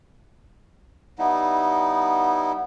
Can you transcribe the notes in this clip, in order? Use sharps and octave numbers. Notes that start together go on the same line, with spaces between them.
G3 B3 D#4 E4